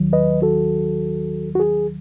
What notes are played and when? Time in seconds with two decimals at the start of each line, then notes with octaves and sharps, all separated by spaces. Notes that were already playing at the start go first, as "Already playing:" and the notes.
Already playing: D#2 D#3 F#3
0.13 B4 D#5
0.42 F#4 A4
1.55 F#4
1.60 G#4